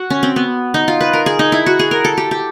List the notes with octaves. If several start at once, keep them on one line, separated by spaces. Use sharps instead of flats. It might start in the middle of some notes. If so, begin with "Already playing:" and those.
Already playing: F#4
C#4
C4
B3
D#4
F4
B4
A#4
G#4
D#4
E4
F#4
G#4
A#4
A4
G4
G4